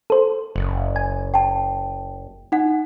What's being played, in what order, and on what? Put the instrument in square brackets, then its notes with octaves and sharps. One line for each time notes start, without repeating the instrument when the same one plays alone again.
[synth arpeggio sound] A4 C5
[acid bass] F#1
[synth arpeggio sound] G#5
[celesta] G5 A5
D#4 F#5